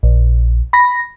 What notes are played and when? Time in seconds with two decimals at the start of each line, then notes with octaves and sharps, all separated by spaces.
0.03 A#1
0.73 B5 A#6